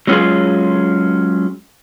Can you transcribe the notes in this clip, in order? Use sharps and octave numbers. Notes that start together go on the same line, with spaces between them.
F#3 G#3 C#4 E4 F4 G#4